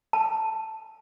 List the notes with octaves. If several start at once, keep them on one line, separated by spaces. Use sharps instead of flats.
A5